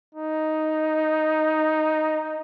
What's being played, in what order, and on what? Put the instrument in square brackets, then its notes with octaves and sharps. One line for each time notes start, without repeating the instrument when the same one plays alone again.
[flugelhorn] D#4